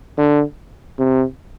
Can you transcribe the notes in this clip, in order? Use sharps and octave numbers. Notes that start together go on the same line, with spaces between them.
D3
C3